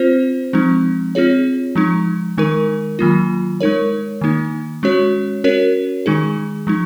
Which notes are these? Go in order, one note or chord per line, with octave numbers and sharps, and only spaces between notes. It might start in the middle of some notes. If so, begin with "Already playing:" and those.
Already playing: C4 F4 C5
F3 G#3 C4 D#4
C4 F4 G#4 C#5
F3 G#3 D#4
D#3 G#3 D#4 A#4
D#3 F#3 A#3 F4
G#3 D#4 A#4 C#5
D#3 A#3 D#4
G#3 C#4 F#4 C#5
C#4 F#4 A#4 C#5
D#3 G#3 D#4 G#4
F3 G#3 D#4